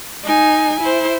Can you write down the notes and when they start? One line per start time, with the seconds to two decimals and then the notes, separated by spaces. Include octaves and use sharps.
0.24 D#4 G#5
0.80 E4 C5